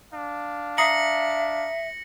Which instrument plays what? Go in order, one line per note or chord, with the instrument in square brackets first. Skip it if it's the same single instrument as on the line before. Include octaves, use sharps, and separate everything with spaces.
[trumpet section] D4 F5
[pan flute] E5 [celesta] A#5 D#6 C7 [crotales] A#6 C#7 F#7